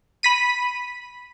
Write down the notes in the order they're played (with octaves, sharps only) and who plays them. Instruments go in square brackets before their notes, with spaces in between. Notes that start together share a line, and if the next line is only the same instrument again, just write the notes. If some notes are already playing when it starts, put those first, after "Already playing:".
[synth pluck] B5 B6 D#7